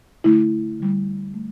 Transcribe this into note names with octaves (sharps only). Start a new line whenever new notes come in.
D3 A3 E4
D3 G3
A3